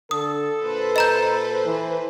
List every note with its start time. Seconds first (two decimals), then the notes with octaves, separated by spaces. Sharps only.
0.11 D3 A4 D#6
0.63 A#2 B4 C5
0.96 D#5 A#5 G6
1.65 E3